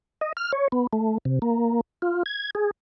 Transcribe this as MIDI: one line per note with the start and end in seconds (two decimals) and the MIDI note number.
0.21 0.33 75
0.37 0.52 89
0.52 0.68 73
0.72 0.87 59
0.93 1.18 57
1.25 1.39 48
1.42 1.81 58
2.02 2.23 65
2.26 2.51 92
2.55 2.71 68